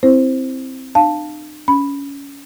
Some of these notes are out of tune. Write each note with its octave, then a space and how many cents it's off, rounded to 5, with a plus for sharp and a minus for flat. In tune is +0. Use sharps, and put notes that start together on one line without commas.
C4 +0 E4 +0 C5 +5
D#4 -45 F5 +0 A5 +0
C#4 +20 B5 +0